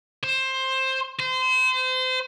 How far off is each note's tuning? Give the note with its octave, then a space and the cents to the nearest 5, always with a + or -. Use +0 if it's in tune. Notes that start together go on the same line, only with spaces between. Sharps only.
C5 +15
C5 -30